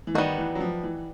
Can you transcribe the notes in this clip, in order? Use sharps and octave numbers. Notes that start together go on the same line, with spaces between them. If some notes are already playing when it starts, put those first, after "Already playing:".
E3
D#3 G3 B3 D#4 F#4
E3
F#3
F3
E3